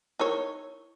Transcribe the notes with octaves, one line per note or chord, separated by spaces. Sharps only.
D#4 E4 A#4 C#5 C#6